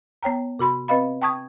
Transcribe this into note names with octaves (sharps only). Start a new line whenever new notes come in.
B3 C#5 G5 A#5
C3 F#4 B5 C6
C4 B4 D#5 F5 B5
G5 A5 C#6 D#6 G#6